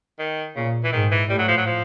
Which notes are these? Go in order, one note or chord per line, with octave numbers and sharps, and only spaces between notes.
D#3
A#2 C#3
E3
G#2 D#3
E3
A2 G3
F#3
F3
F#3
F3